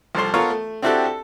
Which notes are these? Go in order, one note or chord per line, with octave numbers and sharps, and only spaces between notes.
C2 F3 A4 C5
B3 F4 A4 A#4 C#5
A3
C4 D4 E4 F#4 G4 A4
A4